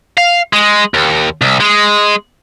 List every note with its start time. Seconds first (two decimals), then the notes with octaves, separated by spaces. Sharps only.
0.17 F5
0.53 G#3
0.94 D#2
1.41 C2
1.60 G#3